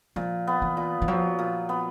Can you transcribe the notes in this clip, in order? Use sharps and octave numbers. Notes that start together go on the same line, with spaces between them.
A#2 F3
B3
E3
A#2
E3
F3 F#3
A#2
B3